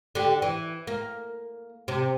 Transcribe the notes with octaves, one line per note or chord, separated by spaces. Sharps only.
D3 G4
E3
A#3
C3